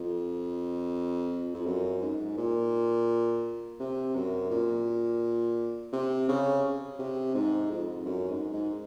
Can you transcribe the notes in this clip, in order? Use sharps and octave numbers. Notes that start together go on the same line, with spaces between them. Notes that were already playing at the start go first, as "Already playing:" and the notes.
Already playing: F2
F2
F#2
G#2
A#2
C3
F#2
A#2
C3
C#3
C3
G#2
F2
F#2
G#2
G#2